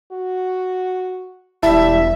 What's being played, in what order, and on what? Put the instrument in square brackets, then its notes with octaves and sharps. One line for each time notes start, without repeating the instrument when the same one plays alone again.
[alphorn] F#4
[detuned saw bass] E1 [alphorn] G3 [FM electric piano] E4 A5 [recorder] E5